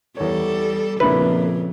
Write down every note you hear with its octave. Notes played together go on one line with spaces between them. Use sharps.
E2 G3 A4 C#5
F2 A#2 C#3 A#3 D4 E4 B4